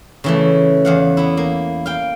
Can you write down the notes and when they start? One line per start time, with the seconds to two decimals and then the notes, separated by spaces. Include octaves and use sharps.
0.24 C#3 E3 A3
0.85 E2 F5 F#5
1.17 B3 E4
1.37 A#3
1.86 F5 G5